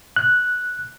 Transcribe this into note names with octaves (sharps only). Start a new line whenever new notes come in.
F#6